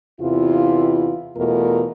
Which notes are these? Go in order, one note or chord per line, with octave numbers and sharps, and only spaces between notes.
E2 C3 E4 F4
E2 B2 A3 F4 A#4